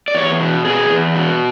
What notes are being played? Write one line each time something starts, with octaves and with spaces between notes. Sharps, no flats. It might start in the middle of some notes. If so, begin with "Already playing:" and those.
D5
E2 C#5
B2
B2 G#4
E2
B2